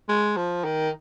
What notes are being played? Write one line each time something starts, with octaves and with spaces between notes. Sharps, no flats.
G#3
F3
D#3